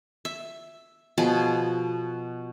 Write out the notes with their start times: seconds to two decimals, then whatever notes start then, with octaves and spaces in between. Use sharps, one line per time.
0.25 E5
1.18 B2 F3 G#4 B4